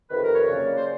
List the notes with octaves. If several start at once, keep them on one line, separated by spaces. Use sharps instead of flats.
F2 C3 D#3 B4
A#4
C#5
D#5
C#3 F#3 A#3 D5
C5